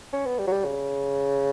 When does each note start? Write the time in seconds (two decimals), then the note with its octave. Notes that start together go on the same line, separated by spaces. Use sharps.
0.13 C#4
0.26 B3
0.39 G3
0.47 F#3
0.52 G3
0.65 C#3